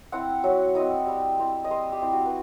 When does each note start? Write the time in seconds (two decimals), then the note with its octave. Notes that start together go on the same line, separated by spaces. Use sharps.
0.12 C4 E4 F#5
0.44 F#3 E5
0.75 C4 E4 D#5
1.07 G3
1.40 C4 E4
1.64 D#5
1.71 G3 C5
1.92 G4
2.02 C4 E4
2.13 F#4
2.26 B4